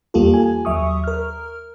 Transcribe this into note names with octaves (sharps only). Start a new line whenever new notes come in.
E2 G3 A#3 F4 G4 A4
G#5
D#2 F#3 E5 C#6 D#6
A#4 F6